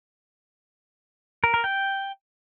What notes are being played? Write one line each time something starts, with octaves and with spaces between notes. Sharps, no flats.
A#4
A#4
G5